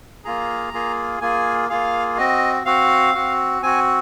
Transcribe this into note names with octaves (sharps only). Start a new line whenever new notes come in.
A#3 F4 G#4 A#5
A#3 F4 G#4
A#3 F4 G#4 G#5
A#3 F4 G#4 F5
C4 F#4 D#5
C4 F#4 F5
C4 F#4
C4 F#4 G#5